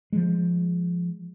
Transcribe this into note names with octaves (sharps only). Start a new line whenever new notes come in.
F3 G#3